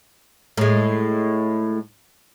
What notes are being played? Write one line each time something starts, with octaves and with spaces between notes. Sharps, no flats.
A2 G#3